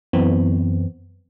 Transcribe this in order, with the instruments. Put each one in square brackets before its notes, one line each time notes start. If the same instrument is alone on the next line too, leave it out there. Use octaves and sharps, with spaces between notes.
[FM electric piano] F#2 E3 B3 C4